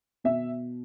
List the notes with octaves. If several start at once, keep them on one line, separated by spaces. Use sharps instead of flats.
B2 E5